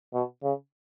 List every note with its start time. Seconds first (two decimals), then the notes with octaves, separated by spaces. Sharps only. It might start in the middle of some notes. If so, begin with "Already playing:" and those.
0.14 B2
0.43 C#3